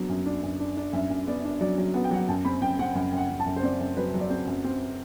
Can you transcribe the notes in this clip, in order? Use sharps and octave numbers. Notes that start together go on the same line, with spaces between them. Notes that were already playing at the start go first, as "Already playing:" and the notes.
Already playing: F#3 B3 D4
F#2
D4
F#2
D4
D4
F#2 E5
F#2
B3 D5
D4
F#3 D5
F#3
B3 F#5
G5
F#3 F#5
F#2 A5
C4 B5
F#2 G5
C4 F#5
F#2 F#5
F#2
F#5
F#2
A5
F#2
C5
C4 D5
F#2
F#3 B4
F#3
D5
C4 C5
F#2
C4